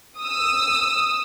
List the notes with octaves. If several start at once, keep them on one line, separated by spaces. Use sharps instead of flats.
D#6 E6